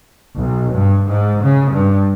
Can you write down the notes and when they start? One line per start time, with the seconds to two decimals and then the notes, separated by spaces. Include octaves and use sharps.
0.38 B1
0.75 G2
1.08 G#2
1.43 C#3
1.73 G2